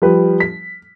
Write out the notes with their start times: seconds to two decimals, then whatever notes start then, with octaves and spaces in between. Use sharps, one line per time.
0.02 F3 G3 B4
0.40 B6